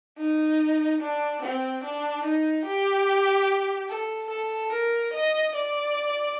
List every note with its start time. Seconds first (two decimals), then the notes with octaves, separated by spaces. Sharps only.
0.18 D#4
1.01 D4
1.42 C4
1.84 D4
2.25 D#4
2.65 G4
3.90 A4
4.30 A4
4.72 A#4
5.13 D#5
5.55 D5